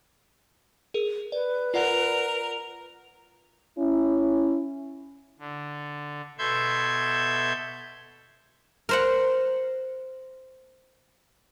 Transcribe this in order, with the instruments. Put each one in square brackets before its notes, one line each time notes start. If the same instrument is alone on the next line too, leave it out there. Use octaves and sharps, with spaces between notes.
[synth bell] G#4 A#4
[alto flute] B4 [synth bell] D5
[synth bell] F4 D5 F#5 [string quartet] A#4
[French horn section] C#4 E4
[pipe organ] D3
B2 A4 E5 C6 G6 G#6
[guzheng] A#4 C5 F#5